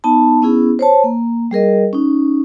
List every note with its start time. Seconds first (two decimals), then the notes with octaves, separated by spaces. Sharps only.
0.04 B3 D#4 A5
0.42 B3 C#4 E4 G#4
0.79 C5 C#5 A5
1.04 A#3
1.51 G3 G#4 A#4 D#5
1.93 C#4 D#4